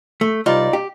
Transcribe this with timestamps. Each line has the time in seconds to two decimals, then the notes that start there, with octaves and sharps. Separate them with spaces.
0.21 A3
0.46 C2 G3 D#4 F4 D5
0.73 G4